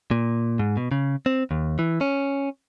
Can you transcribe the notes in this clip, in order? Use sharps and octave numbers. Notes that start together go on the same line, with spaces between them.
A#2
G#2
B2
C#3
C4
D#2
E3
C#4